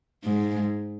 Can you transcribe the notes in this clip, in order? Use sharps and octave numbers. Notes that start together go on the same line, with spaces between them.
G#2